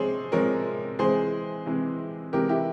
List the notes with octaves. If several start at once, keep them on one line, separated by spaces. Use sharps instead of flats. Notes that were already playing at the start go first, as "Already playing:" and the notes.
Already playing: C3 F3 G#3 G#4 C5 C#5
C3 F3 G#3 A#4 C#5
C3 E3 G#3 G#4 C5
C3 E3 G#3
C3 E3 G#3 G4 A#4
E4 G4